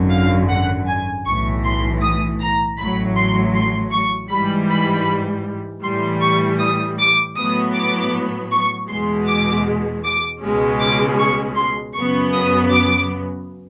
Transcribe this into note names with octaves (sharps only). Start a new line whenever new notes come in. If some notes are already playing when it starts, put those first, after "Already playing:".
Already playing: G#1 F#2 D3 F#3
F5
F#5
G#5
B1 A2 E3 C#6
C6
D#6
A#5
A1 A2 F#3 B5
C6
C6
C#6
G#2 E3 G3 B5
B5
A2 E3 G3 C6
C#6
D#6
D6
A2 F#3 B3 D#6
D6
C#6
E2 B2 G#3 C6
D6
D6
C#2 B2 G#3 C#4
D6
C#6
C6
F#2 C#3 F#3 B3 C#6
D#6
D6